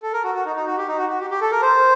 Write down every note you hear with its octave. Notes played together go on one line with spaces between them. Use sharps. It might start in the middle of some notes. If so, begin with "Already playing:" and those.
A4
A#4
F#4
F#4
D#4
D#4
F#4
G4
D#4
F#4
F#4
G4
G4
A4
A#4
C5